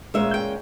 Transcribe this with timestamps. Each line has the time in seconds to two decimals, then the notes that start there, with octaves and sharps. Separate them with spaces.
0.14 A#2 G#3 C#4 E5
0.34 G5